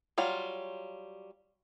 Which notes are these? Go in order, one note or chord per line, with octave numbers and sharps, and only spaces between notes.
F#3 G3 F4